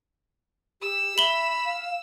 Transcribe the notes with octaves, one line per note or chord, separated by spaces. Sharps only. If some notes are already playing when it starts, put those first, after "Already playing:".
G4 E6
E5 B5 F#7 G7
F5